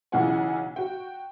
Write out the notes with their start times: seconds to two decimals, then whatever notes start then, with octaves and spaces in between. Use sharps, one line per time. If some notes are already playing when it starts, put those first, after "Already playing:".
0.12 B1 C#3 E3 F4 F#5 G#5
0.76 F#4 G5